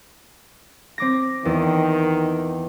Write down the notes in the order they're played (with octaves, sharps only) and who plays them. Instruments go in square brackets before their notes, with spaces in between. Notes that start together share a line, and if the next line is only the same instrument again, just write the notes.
[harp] C4 D6 A#6
[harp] E2 [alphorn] D#3